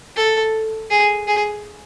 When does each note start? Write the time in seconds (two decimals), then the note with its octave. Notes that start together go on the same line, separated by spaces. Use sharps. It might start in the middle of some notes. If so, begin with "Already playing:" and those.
0.16 A4
0.91 G#4
1.28 G#4